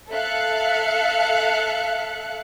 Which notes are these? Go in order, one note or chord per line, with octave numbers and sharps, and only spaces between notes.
A4 E5 F5 F#6 C#7